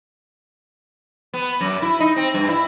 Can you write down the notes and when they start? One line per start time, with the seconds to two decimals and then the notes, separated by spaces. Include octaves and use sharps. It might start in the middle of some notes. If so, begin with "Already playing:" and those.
1.34 B3
1.61 F#2
1.82 E4
2.00 D#4
2.16 C4
2.34 G2
2.49 E4